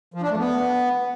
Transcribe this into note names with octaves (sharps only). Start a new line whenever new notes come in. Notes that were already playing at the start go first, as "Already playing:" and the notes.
F3
D4
A3
B3